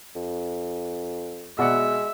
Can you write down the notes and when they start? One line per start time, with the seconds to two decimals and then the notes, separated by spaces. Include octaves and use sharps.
0.16 F2
1.59 B2 G#3 D5 E5 F#5